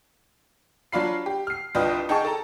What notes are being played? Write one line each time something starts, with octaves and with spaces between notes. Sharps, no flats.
F#3 D4 F4 F5 B5 C7
G4
F6 C7
C2 D4 F4 B4 D#5 G5
D#4 G#4 G5 A5 C#6
A4 A5 A#5